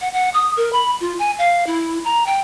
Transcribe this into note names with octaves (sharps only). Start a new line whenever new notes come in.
F#5
F#5
D#6
A#4
B5
F4
G#5
F5
E4
A#5
G5